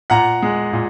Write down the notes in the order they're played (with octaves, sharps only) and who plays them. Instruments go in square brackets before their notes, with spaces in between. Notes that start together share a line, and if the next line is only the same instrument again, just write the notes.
[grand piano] A#2 F#5 A#5
G#3
A#2